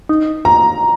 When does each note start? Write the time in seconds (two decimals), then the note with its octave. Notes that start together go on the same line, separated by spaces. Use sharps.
0.09 D#4
0.45 A#5